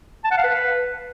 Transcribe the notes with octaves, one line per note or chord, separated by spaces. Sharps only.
A5
F#5
F5
B4